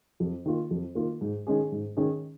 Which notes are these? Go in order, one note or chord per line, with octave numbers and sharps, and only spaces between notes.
F2
D#3 A#3 F4
F2
D#3 A#3 F4
G#2
D#3 G#3 C#4 G#4
G#2
D#3 G#3 C#4 G#4